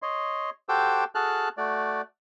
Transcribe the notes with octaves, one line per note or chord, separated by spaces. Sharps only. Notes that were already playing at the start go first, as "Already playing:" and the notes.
C#5 D#5 C6
F#4 G4 A4 C5 D6 E6
F#4 G#4 A4 A5 F6 F#6
A3 F#4 D5